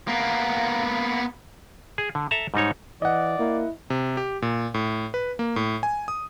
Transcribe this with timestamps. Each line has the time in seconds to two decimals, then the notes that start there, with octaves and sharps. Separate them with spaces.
0.08 A#3 B3
1.98 G#4
2.15 D3
2.31 A4 E5 A5 A#5
2.54 G#2 G3 D#4 C#5
3.02 E3 D5 D#5 F#5
3.39 A#3 E4
3.90 C3
4.17 G4
4.42 A#2
4.74 A2
5.14 B4
5.39 A#3
5.56 A2
5.83 G#5
6.08 D#6